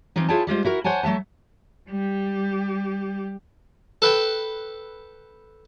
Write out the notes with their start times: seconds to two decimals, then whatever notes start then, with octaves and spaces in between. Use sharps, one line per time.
0.16 E3 F3 C4 D#4
0.28 E4 F4 G#4 C#5 G5 A5
0.47 G3 G#3 F4 C5
0.65 E4 F#4 A#4
0.84 C5 C#5 F#5 G#5 A5
1.03 F#3 A3 E5 A5
1.89 G3 G4
4.02 A4 B4 G5 A5